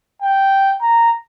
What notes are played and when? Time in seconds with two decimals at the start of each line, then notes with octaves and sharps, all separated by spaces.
0.22 G5
0.82 A#5